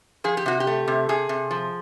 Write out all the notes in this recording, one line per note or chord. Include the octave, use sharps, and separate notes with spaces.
F3 G#4
G4
C3 F#4
G4
A3
C3
C3 G#4
C3
F3